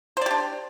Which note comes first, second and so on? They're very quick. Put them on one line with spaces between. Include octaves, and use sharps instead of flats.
C5 D5 G4 D4